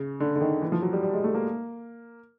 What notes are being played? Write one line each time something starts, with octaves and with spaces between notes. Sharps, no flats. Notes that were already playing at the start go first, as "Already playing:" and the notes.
Already playing: C#3
D3
D3
D#3
E3
F3
F#3
G3
G3
G#3
A3
A#3